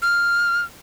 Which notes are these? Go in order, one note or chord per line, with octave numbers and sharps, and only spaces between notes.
F6